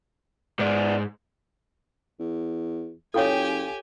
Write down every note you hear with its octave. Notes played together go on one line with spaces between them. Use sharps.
G#2 B3 D5
E2
F#1 F4 G4 A4 C#5 G5 G#5